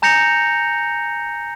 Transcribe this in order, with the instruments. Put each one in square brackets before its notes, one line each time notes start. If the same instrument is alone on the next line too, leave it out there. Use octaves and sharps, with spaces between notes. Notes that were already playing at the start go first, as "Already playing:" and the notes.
[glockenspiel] G#5 A#5 G6 A#6 C#7 F7